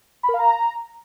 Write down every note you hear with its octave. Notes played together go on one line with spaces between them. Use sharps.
B5
A#4
F5
A#5